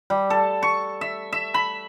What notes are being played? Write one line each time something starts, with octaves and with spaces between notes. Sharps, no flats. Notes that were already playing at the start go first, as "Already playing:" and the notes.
G3
A4
C#6
E5
E5
B5